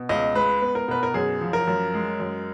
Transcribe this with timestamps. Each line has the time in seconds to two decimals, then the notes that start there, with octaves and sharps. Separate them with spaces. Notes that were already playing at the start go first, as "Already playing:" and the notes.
Already playing: B2
0.09 C#2 D#5
0.35 G#3 B4
0.62 B3
0.75 A#4
0.88 B2 B4
1.03 A#4
1.14 F#2 G#4
1.41 F3
1.53 A#4
1.68 F#2
1.94 G#3
2.20 F#2